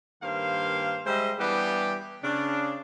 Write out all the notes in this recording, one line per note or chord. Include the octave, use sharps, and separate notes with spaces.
G2 D#3 A#3 C5 F5
G3 G#3 C5 D#5 E5
E3 G3 B3 D4 G4
C#3 D4